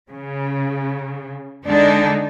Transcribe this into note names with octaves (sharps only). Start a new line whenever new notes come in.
C#3
D3 G#3 D4 D#4